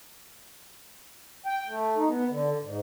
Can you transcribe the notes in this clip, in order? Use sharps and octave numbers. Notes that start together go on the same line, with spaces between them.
G5
A3
D#4
B3
D3
G#2